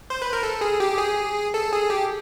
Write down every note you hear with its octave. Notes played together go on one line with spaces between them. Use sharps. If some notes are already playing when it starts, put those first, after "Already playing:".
C5
B4
A#4
A4
G#4
G4
G#4
A4
G#4
G4